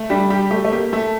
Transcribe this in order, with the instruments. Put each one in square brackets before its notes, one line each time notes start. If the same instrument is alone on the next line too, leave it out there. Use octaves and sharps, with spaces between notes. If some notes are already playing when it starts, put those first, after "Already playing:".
Already playing: [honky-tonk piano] A3
[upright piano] G3 [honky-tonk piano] D4
[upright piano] G3 [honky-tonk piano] G4
[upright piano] A3 [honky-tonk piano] G4
[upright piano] A3
[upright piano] A#3 [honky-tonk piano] G4
[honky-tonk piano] A3 [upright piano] A4